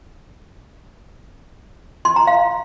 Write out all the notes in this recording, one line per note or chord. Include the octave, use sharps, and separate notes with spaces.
C6
A#5
F5